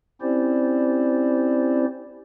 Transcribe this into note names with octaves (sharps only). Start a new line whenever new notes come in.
C4 C#4 E4 G4 C5 D5